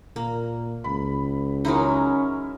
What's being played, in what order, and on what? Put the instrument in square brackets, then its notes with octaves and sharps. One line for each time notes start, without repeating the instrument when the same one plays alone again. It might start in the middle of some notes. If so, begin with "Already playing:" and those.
[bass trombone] A#2 [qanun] A#3
[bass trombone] C#2 [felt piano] B5
[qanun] F#3 G#3 D#4 [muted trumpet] C#4 [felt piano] E4 A#4